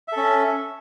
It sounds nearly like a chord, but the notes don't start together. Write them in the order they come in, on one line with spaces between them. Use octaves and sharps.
E5 A4 C#4